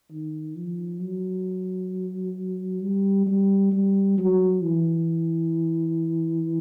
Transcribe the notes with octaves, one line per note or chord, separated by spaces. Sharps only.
D#3
F3
F#3
G3
G3
G3
F#3
E3